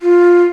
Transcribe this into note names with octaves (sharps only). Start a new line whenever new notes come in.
F4